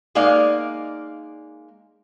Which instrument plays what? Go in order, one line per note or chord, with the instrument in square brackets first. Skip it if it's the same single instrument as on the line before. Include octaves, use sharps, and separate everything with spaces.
[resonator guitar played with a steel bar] G#3 A#3 D#4 D5 F5